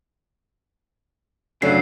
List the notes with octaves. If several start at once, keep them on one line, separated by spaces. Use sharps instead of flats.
F#2 C#3 F#3 A3 D4 C7